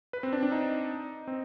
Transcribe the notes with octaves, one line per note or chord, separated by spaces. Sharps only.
B4
C4
D4
D4
D#4
C4